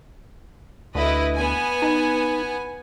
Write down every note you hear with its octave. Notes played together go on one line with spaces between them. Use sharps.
D2 E4 B4 D#5
B3 G#5
D#4